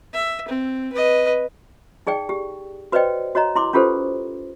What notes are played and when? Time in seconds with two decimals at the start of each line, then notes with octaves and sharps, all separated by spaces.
0.14 E5
0.48 C4
0.93 B4 D#5
2.07 D#4 G#4 D5 G5
2.29 G4
2.92 F#4 B4 C5 D5 D#5 G5
3.35 F#4 C#5 D#5 A#5
3.56 E4 C6 D6
3.73 C#4 F4 G4 A4 B4 C5